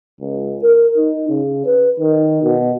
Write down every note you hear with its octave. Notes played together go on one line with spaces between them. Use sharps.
C#2
A#4
D#4
C#3
B4
D#3
B2